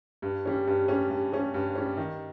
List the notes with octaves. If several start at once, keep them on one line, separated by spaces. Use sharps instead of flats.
G2
G3 C#4
G2
G3 C#4
G2
G3 C#4
G2
G3 C#4
D#3